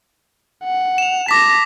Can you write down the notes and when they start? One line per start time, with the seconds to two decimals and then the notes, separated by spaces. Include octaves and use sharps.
0.64 F#5
0.98 E7 F7
1.28 A5 D6 A#6 B6